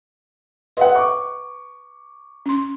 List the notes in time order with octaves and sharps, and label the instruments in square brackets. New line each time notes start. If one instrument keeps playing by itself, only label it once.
[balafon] B4 C6 [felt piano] D#5 E5 F#5
[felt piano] C#6 D6
[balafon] C#4 C6